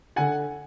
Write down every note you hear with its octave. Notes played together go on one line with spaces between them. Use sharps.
D3 F#5 G#5